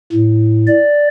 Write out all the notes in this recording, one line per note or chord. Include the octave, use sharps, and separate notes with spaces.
A2
D5